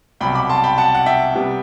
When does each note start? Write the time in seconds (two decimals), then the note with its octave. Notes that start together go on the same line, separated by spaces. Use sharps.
0.21 C2 B2 F#3 G5 B5
0.35 B5 D6
0.49 A5 C6
0.64 G5 B5
0.78 F#5 A5
0.95 F#5
1.06 E5 G5
1.35 C3 G3 B3